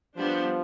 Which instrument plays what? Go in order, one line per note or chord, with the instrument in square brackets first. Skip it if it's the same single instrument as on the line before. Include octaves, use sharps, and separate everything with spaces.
[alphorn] F3 [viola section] G3 B3 D4 G4 C5